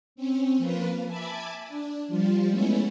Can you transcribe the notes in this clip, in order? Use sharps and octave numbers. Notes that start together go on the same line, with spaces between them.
C4 C#4
F3 A#3 F4 B4
E5 G#5 A5 B5 D6 G#6
D4
F3 G3 F4
G#3 A3 B3 C#4 E4